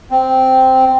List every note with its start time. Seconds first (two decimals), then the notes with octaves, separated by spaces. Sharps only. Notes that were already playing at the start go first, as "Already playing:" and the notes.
0.11 C4